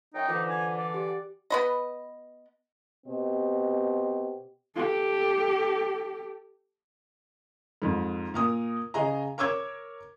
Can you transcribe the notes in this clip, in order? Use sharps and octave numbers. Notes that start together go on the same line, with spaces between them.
F#2 F#3 D#4 G5
D3 E3 F4 C5 D6
G#5
D5
G4
B3 B4 D#5
B2 C4 G4 C5 D#5
G4 A4
F2 G#2
A#2 A#4 D#6
C#3 G#4 D#5 A#5
A#4 C#5 D6 E6 G#6